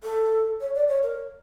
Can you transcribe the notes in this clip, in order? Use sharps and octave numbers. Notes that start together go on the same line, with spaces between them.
A4
C#5
D5
C#5
A#4